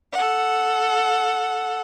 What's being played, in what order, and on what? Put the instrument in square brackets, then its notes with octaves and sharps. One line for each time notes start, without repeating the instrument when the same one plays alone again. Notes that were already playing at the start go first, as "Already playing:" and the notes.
[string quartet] A4 F#5